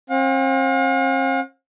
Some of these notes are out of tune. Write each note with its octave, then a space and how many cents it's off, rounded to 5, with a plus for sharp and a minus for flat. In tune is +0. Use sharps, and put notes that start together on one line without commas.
C4 +40 F5 +45